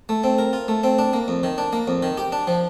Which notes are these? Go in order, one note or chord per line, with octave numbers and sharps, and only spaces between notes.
A3
C4
A#4
F4
A3
C4
D4
A#3
F2
D#3
D4
A#3
F2
D#3
G4
D4
F3